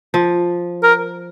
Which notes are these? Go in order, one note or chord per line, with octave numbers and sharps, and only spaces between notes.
F3
A#4